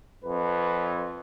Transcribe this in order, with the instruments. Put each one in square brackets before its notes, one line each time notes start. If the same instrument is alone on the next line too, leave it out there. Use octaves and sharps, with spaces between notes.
[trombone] F2 [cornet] B4